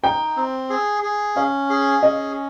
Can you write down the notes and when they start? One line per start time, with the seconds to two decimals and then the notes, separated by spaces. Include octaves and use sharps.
0.04 D#4 G5
0.36 C4
0.70 G#4
1.03 G#4
1.36 C#4 F5
1.70 G#4
2.03 C#4 D#5